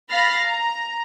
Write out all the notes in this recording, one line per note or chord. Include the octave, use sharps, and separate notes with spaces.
F5 B5 F6 A6 A#6 C7
A#5